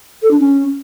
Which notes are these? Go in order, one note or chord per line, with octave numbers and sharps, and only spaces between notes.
A4
D4
C#4